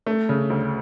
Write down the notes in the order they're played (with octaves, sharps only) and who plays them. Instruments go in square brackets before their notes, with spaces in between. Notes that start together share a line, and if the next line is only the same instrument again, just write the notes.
[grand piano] A3
C#3
D2